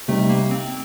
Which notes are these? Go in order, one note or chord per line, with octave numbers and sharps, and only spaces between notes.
C3 G3 A3 C4 D#4
A#3
C4